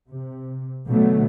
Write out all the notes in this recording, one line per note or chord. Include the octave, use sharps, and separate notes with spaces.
C3
B2 D3 F#3 A3